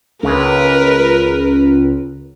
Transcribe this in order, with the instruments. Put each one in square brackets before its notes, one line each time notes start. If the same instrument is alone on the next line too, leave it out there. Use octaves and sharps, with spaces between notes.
[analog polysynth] C#2 [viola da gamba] A#4 B4